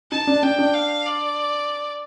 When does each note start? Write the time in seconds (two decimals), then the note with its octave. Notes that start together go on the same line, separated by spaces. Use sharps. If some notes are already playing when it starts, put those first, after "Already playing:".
0.12 D#4 A5
0.27 D4
0.43 D4 G5
0.59 D4
0.74 F5
1.06 D5